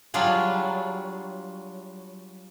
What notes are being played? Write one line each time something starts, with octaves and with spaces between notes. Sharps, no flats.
F#3 G3 D4 F4 G#4